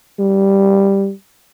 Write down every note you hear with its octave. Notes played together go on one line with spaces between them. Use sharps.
G3